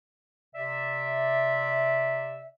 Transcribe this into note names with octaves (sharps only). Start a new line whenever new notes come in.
C3 D5 E5